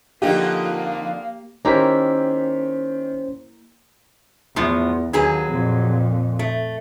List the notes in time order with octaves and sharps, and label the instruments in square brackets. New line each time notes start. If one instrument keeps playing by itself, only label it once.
[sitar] F2 D3 D#4 [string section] A#3 [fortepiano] G4 [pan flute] F5
[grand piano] D#3 G4 [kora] A#3 E4 A#4 [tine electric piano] C#4 C5 B6
[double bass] E2 [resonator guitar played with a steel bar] A2 F3 B3
[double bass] D#2 [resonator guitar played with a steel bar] F#3 G#4 B4
[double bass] F2 A#2
[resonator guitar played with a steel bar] A3